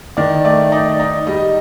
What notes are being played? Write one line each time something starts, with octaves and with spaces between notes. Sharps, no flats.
D#3 D5
A3 D5
D#4 D5
D#4
G3 D#5